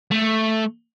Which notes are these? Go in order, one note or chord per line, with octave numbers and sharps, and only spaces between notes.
A3